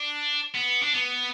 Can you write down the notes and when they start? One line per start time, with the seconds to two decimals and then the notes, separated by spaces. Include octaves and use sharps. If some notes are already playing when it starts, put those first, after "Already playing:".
Already playing: D4
0.55 B3
0.82 D4
0.93 B3